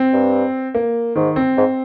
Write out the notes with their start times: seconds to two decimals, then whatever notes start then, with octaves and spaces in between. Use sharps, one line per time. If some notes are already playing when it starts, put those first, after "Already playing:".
Already playing: C4
0.13 G2
0.75 A#3
1.15 G#2 D#3
1.36 C4
1.58 G#2